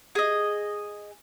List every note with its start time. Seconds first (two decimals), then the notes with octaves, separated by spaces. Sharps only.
0.15 G#4 D#5